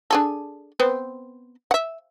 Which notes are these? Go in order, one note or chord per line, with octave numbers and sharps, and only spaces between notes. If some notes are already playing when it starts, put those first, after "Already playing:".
D4 G#4 A4
B3 C4 C5
E5 F#5